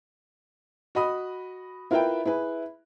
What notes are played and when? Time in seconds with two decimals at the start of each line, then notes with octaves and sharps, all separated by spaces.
0.95 F#4 D#5 B5 D#6
1.91 E4 F4 A#4 B4 E5 G5
2.25 E4 G#4 B4